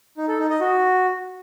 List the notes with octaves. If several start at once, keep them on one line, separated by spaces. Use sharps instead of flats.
D#4
A4
D#4
D#5
F#4